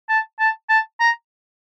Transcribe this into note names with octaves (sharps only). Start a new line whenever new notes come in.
A5
A5
A5
A#5